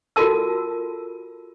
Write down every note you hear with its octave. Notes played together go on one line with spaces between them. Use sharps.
F4 F#4 A4 A#4 A5 E6